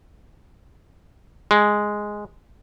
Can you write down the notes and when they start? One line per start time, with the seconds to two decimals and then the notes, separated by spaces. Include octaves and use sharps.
1.51 G#3